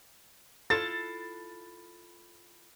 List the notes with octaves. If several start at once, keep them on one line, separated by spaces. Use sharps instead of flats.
E4 F4 A4 A6